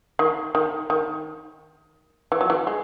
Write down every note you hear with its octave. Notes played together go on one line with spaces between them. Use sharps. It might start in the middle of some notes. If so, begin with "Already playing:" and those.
D#3
D#3
D#3
E3
F#3
E3
G#3